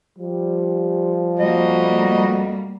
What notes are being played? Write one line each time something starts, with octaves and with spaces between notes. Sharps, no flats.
F3 G3
F2 B2 G3 A#3 F#4 D#5